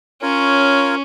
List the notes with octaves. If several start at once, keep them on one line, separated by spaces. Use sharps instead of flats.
C#4 F4 A#4 C#5